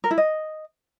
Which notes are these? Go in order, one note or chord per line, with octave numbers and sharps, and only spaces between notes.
A#4
E4
D#5